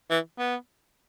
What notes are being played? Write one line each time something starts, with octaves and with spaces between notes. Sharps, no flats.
E3
B3